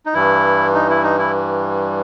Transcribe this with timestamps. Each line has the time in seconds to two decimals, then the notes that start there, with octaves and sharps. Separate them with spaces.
0.06 D#4
0.14 G2 E3 G3 E4
0.74 D#4
0.89 E4
1.04 D#4
1.18 E4